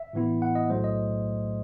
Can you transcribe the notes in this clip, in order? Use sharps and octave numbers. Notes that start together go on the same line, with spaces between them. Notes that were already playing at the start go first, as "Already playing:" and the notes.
Already playing: E5
A2 E3 B3 E4
F#5
D#5
B1 A2 F#3 A3 C5
D#5